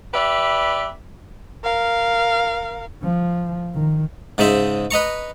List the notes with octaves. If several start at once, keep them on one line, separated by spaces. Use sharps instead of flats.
G4 B4 D5 E5
A#4 F5
F3
D#3
G#2 C#3 G#3 C5 E5
B4 D#5 A#5 C#6